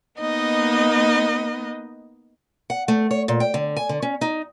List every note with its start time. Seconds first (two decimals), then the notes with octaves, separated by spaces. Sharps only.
0.20 A#3 B3 D#4 D#5
2.70 F#5
2.88 A3
3.11 C#5
3.28 A#2
3.40 G5
3.54 D3
3.77 G#5
3.89 D3
4.02 C#4
4.21 D#4